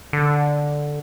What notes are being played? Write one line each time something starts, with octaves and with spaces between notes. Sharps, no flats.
D3